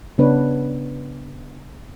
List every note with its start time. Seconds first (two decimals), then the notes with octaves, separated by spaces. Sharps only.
0.18 C#3 B3 D4 B4 C#5